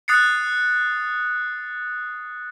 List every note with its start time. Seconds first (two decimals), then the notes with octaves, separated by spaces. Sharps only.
0.08 D#6 F#6 A6 C7 C#7